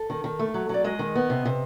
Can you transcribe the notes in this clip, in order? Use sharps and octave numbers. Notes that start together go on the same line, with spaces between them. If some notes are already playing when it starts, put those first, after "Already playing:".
Already playing: A4
D#3
D#3
A3
F#3
F#3 D5
G#3 D#5
D#3
B3
C3
C3